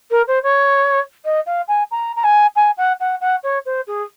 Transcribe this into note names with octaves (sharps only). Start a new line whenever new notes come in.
A#4
C5
C#5
D#5
F5
G#5
A#5
A#5
G#5
G#5
F#5
F#5
F#5
C#5
C5
G#4